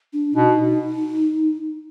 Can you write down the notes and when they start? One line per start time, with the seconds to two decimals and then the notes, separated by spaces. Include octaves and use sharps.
0.13 D4
0.34 B2 D#4